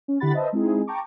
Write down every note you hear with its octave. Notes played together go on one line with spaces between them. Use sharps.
C#4
D3 E4 G4 F#5 B5 A6
B4 C5 D#5 E5 A5
G#3 C4 D#4 E4 G#4
G5 A5 A#5 C#6 D6